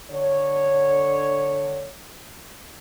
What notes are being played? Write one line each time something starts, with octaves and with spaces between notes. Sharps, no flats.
D3 C#5